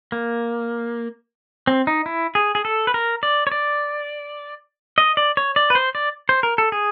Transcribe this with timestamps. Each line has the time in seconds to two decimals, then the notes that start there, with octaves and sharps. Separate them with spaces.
0.12 A#3
1.67 C4
1.87 D#4
2.06 E4
2.35 G#4
2.55 G#4
2.65 A4
2.87 B4
2.94 A#4
3.23 D5
3.47 C#5
3.52 D5
4.98 D#5
5.17 D5
5.37 C#5
5.56 D5
5.70 B4
5.75 C5
5.95 D5
6.29 C5
6.43 A#4
6.58 A4
6.72 G#4